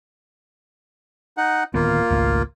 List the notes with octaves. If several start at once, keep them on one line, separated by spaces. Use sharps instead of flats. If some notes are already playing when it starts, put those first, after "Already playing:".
D#4 F#5
D1 D#3 A#3 B3 F4
G#1 C#2 A3